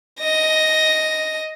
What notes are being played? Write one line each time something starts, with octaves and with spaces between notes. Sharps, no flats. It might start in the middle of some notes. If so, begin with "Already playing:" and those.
D#5 A#6